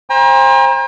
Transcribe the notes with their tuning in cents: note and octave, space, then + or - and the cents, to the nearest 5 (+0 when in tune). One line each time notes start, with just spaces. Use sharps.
C5 +25 G5 +45 A#5 +35